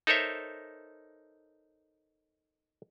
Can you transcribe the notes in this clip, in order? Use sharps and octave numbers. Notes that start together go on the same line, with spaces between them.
D#4 A4 A#4 C5 C#5 E5